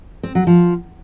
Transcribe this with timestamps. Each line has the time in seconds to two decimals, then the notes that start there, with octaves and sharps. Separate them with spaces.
0.23 C4
0.35 F#3
0.47 F3